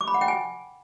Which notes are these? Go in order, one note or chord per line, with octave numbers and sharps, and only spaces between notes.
D6
B5
F#5
G5
G#5